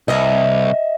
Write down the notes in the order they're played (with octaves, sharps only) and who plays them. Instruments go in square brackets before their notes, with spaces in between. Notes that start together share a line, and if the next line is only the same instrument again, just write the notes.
[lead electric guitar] C2 [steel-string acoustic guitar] D#5 E5